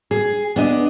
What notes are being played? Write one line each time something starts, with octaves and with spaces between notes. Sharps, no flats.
G#4
B3 D4 D#5